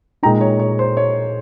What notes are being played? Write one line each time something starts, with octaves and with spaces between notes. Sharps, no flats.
A#2 G#3 D#4 G5 A#5
C#5
C#5
C5
C#5